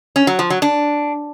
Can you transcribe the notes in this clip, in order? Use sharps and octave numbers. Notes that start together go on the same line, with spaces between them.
C#4
F#3
F3
F#3
D4